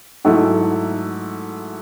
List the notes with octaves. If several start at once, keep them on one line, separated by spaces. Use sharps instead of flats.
G#2 F#3 A3 E4